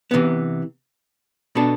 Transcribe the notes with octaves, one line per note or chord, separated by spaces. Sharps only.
C3 E3 B3
B2 B3 D4 A4